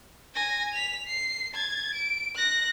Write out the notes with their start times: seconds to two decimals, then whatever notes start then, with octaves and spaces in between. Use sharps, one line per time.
0.34 G#5 A#6
0.74 B6 F7
1.07 C7
1.54 G#6 A6
1.93 D7
2.35 F#6 A#6